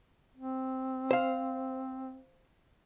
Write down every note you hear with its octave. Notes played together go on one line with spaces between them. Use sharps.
C4
C5 F5